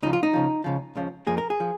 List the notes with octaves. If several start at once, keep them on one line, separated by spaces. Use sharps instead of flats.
C#2 C#3 F3 D#4
F4
D#4
C#2 C#3 F3
C#2 C#3 F3
C#2 C#3 F3
F2 F3 A#3 G#4
A#4
G#4
F3